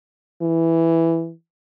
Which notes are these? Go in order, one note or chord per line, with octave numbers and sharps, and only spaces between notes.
E3